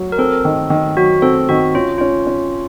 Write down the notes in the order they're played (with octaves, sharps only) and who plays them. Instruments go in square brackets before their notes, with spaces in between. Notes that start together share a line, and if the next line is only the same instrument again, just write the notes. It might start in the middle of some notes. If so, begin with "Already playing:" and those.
Already playing: [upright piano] F#3
[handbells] A#4
[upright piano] C4 [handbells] A4
[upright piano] D#3
D#3
[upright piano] F#3 [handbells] F#4
[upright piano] C4 [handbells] A4
[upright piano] D#3 [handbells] F#4
[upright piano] C#4 [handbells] F4
[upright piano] C#4 [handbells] F4
[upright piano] C#4